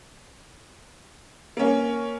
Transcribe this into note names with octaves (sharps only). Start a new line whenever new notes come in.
A#3 C#4